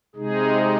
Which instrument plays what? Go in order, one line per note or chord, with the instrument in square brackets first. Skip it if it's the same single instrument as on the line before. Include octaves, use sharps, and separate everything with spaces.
[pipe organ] C3 G#3 D#4 G#4